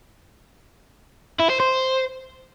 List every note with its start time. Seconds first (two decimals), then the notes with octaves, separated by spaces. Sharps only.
1.40 E4
1.50 C5
1.60 C5